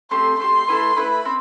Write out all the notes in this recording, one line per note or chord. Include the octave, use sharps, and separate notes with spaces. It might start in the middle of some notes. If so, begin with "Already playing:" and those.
A3 C4 G4 C6
A3 C4 G4 C6
A3 E4 B4
A3 E4 B4 B5
C4